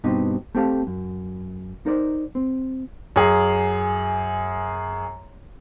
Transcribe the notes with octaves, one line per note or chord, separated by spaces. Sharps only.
G2 B2 C4 D#4 G4
A3 C4 G4 F5 A5
F#2
D#4 A#4 C5 D5
C4
F#2 G#4